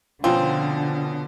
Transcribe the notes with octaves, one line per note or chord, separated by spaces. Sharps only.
B2 D3 F3 C4 C#4 F4